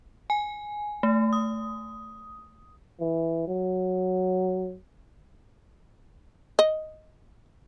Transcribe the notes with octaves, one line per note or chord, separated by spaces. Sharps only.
G#5
A3
D#6
E3
F#3
D#5